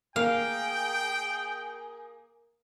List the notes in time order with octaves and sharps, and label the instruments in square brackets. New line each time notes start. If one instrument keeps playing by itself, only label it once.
[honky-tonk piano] A#3 [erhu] G#4 [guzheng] F5 [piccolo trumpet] G5